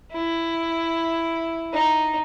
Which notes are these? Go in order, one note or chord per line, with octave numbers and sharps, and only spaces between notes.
E4
D#4